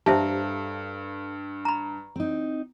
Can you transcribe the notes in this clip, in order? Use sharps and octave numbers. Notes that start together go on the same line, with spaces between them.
G2 G4 A4 C5 E5 F5 A5 A#5
A#5 B5
C4 D#4